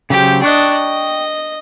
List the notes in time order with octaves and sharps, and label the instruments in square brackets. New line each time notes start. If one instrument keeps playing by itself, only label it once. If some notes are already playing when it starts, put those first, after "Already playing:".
[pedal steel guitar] C#3 F#3 C5 [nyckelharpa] G4
[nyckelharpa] D4 D#5 [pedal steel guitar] G5 C#6 F#6
[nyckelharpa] D#5